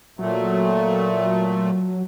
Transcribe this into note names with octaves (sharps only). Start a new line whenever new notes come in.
A#2 F#3 A3